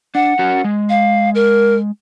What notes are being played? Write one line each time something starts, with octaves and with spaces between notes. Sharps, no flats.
D4 F#5
C#4 F#4 A#4
G#3
F5
A#4